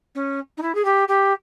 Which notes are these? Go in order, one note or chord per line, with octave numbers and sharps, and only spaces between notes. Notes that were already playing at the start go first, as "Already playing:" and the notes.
C#4
D#4
E4
G#4
G4
G4